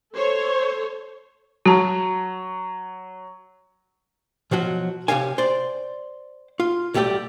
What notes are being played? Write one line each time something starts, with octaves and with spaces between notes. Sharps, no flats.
A4 C5 C#5
F#3 F#4 A5
B2 F3 F#3 F#4
C3 E3 G4 C#5 F5 G#5
C5 D5
F4
B1 G3 A3 G4 D5